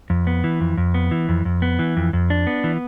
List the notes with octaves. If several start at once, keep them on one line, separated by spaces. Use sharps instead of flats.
F2
B3
E3
F2
F2
B3
E3
F2
F2
B3
E3
F2
F2
D4
B3
E3